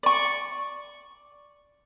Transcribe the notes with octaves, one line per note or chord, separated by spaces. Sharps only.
D5 C#6